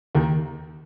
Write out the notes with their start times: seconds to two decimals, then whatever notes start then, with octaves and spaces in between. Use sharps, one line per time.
0.15 D#2 D#3